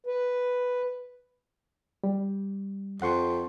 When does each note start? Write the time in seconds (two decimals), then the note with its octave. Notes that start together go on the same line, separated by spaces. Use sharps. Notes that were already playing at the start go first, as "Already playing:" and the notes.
0.06 B4
2.04 G3
3.02 F2 F#5 C6 C#6